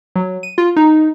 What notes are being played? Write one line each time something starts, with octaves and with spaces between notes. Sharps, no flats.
F#3
D#7
F4
D#4